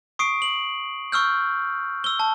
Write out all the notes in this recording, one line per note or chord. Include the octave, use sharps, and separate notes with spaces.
C#6 D#6 C7 D7
F#7
C#6 E6 F6 G6
E6 G7
A5